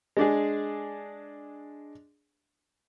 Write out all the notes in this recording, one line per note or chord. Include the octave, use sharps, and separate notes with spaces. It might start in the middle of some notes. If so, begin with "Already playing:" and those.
G#3 D4 G#4